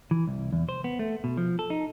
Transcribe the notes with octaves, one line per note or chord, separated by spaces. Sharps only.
E3
C2
E2
C5
B3
A3
B2
F3
A4
D#4